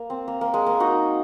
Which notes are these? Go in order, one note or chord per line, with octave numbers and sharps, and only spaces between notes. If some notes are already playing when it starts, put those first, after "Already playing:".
Already playing: A#3
C4
A#3
A#3
G#3
A#3
D#4 F#4